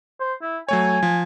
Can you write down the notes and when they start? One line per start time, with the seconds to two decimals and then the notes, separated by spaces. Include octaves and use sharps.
0.20 C5
0.42 E4
0.69 F#3 A3 C#5 G#5
1.03 F3